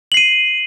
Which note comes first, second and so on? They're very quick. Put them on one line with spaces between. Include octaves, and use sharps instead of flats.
F#7 C7 D#7